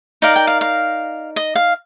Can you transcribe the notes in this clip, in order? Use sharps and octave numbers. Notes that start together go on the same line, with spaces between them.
D#4 A#4 D5 F5
G5
F5
F5
D#5
F5